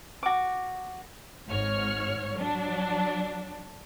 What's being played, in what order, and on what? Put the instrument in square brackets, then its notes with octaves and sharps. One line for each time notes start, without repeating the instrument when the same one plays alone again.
[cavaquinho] F#4 D6
[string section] G#1 G#2 C#5 F6
F#3 D4